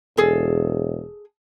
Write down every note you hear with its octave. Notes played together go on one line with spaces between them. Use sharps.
E1 G#4 A4